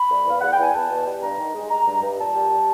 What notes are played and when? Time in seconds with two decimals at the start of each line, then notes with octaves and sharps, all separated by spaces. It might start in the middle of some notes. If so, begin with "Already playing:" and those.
Already playing: B5
0.10 C2
0.25 E2 F5
0.41 E2 F#5
0.52 G5
0.58 E2 G#5
0.74 E2 A5
0.90 B2
1.05 G3
1.21 G2 A#5
1.38 D#3
1.54 G#3
1.70 G#3 A#5
1.86 G2
2.02 G2
2.18 A#2 A5
2.34 G3
2.50 G3